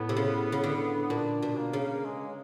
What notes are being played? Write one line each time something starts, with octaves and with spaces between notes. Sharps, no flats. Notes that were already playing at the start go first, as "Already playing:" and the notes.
Already playing: A2 B3
C3
C#3
C#3
D3
A#2 D4
B2
A#3
C#3
G#3